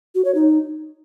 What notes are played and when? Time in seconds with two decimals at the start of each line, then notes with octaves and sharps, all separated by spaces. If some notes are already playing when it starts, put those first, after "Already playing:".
0.15 F#4
0.25 C#5
0.35 D#4